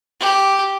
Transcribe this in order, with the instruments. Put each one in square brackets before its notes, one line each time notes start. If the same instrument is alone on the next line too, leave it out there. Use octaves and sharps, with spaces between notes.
[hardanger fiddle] G4